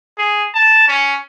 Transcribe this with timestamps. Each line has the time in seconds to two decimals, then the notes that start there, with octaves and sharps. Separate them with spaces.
0.18 G#4
0.54 A5
0.88 C#4